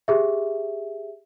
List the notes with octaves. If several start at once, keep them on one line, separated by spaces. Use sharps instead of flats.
G4 G#4 E5